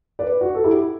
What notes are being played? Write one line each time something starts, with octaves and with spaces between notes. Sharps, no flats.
B4 D5
F#4
A4
E4 G4